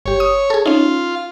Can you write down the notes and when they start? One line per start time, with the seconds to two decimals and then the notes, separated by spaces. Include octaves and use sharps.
0.06 G1 G4 C#5
0.20 D#6
0.50 G#4 A4
0.66 C#4 D#4 F4